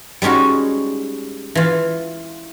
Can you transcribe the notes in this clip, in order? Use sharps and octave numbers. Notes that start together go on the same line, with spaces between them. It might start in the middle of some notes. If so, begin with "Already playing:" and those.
G3 G#3 C#4 D#4 F#4
E3 F4